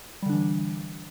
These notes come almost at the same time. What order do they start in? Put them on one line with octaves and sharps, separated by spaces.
G3 D3 D4 E3